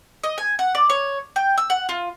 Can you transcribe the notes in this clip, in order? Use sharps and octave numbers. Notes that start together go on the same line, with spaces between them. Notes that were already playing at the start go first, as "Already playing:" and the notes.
D#5
G#5
F#5
D5
C#5
G5
E6
F#5
F4